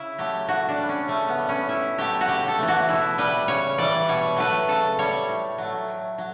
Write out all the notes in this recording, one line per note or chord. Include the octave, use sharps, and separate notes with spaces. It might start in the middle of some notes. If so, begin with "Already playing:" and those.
Already playing: C#3 E4
F#3 A3 G4
A2 F#4
D4
G3
C#4
C#3 A3
B3
G3
C#4
A2 E4
F#3 A3 G4
F#4
C#3 G4
A4
E3 A3
F#4
B2 E4
G3 B4
C#3 C#5
E3 G3 D5
B2 C#5
F#3 A3 B4
C#3 A4
G3 C#5
A2
F#3 A3
A2
F#3